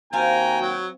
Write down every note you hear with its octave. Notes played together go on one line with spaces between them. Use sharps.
D#2 C4 F4 F#4 G5 G#5 A#5
F#3